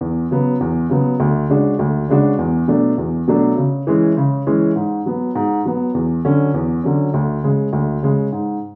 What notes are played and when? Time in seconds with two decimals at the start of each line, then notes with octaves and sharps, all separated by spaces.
0.01 E2
0.31 C#3 F#3 B3
0.61 E2
0.90 C#3 F#3 B3
1.20 D2
1.49 C#3 G#3 D4 F#4
1.79 D2
2.09 C#3 G#3 D4 F#4
2.38 E2
2.68 B2 F#3 A3 D4
2.98 E2
3.27 B2 F#3 A3 D4
3.57 C#3
3.87 E3 G#3 C#4
4.17 C#3
4.46 E3 G#3 C#4
4.76 G#2
5.06 F#3 B3
5.35 G#2
5.65 F#3 B3
5.94 E2
6.25 D3 F#3 C#4
6.54 E2
6.84 D3 F#3 C#4
7.14 D2
7.44 C#3 G#3
7.73 D2
8.03 C#3 G#3
8.32 G#2